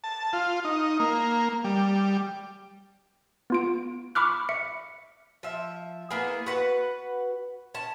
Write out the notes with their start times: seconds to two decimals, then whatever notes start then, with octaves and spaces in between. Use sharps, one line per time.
0.04 A5
0.33 F4
0.65 D#4
1.00 A#3
1.64 G3
3.50 B3 F4 D7
4.15 B5 C#6 D6 F6 F#6
4.49 E5 C#7
5.43 F3 E5
6.11 A#3 B3 E4 G#4
6.46 F#4 B4 F#5
7.74 C#4 A5